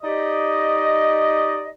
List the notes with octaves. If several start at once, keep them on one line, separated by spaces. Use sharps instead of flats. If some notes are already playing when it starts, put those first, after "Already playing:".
D#4 G4 D5 D#5